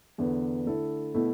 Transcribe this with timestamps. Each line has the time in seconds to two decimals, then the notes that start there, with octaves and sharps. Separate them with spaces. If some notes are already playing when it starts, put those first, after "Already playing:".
0.18 E2 D3 B3
0.66 D3 A3 E4 A4
1.14 B2 A3 E4